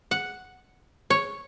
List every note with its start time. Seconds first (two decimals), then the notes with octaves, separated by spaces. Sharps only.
0.11 F#5
1.10 C#5